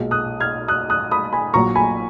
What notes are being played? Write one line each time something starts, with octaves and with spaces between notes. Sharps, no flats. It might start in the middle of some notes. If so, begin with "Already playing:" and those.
Already playing: B1 A#2 G#3
D#6 F#6
F6 G#6
D#6 F#6
D#6 F#6
B5 D#6
G#5 B5
A#1 A#2 F#3 A#5 C#6
G#5 B5